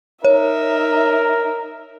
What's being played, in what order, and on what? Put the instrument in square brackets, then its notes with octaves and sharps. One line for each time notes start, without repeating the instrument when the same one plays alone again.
[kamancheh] D#4 E5 [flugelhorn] A#4 [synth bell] C#5